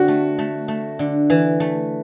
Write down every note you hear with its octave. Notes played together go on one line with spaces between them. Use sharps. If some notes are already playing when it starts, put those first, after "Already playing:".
Already playing: D3 C4 F#4
A3
A3
A3
D3
E3
A3